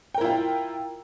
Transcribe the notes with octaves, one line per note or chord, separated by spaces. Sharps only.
E4 F4 A#4 G5